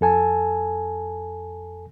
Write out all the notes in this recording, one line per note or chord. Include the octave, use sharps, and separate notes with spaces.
F2 A4 G#5 A5